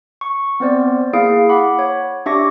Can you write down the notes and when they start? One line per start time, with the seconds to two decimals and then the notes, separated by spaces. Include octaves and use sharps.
0.21 C#6
0.60 B3 C4 C5 D5
1.13 A#3 E4 G#4 F5 D7
1.49 F#5 B5 D6
1.79 C#5
2.26 D4 G4 E5 C#6 D6 A#6